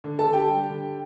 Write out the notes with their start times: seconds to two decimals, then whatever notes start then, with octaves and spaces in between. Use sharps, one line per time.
0.04 D3
0.19 A4 A5
0.25 D3
0.33 G4 G5
0.48 G3
0.70 D3